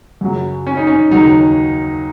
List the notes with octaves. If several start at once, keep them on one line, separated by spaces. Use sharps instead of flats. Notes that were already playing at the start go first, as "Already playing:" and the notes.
F#2 C#3 F#3
C#4
D#4
C#4
D#2 C#3 F#3 D#4